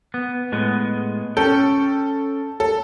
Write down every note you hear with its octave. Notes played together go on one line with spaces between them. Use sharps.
B3
A2 G#3 B3
C#4 A4 G5
A4